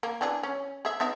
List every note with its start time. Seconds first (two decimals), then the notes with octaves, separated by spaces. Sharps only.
0.03 A#3
0.21 E3 D4 G#4
0.43 C#4
0.85 G#4 E5
1.00 B3 D#4 E5